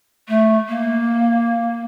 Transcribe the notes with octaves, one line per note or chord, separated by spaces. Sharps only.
A3
A#3